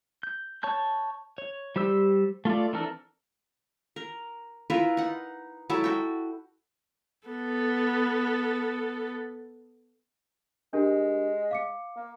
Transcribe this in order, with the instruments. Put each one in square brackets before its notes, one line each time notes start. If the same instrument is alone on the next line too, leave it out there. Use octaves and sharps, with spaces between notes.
[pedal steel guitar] G6
C#5 A5 G6
C#5
G3 G4 C5 E6
A3 F4 A4 D5
E3 C4 D4 A4 A#4
[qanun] A#4
E4 F4 A#4 B4
D#4 F#5
F#3 G#3 E4 A4
F#4 G5
[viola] B3 A4
[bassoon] G#3 [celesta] D4 G4 A#4
[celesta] F5 D6 C#7
[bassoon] A#3